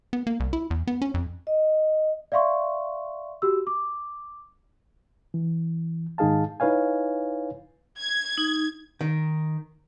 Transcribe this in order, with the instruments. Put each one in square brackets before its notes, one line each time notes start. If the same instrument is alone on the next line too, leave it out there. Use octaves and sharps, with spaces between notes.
[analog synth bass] B3
A#3
C2
E4
E2
B3
C#4
F2
[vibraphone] D#5
[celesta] D5 E5 F5 C6 C#6
F#4 G4 E6
D6
[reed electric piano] E3
G#2 D#3 D#4 G#4 F5 A5
D#4 E4 B4 C#5 F5 G#5
[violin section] G#6
[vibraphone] D#4
[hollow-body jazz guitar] D#3